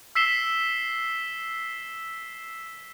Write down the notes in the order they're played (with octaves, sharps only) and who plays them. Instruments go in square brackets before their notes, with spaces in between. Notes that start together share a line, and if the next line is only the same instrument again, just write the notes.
[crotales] E6 B6 C7 E7 G7